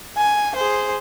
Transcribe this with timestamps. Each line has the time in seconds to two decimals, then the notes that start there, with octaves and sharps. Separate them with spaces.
0.17 G#5
0.56 G#4 C5